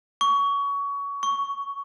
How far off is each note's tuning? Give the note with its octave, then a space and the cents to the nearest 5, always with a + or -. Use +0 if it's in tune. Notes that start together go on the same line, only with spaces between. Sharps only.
C#6 +25
C#6 +10